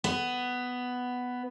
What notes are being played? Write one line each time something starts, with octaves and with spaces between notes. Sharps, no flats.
B3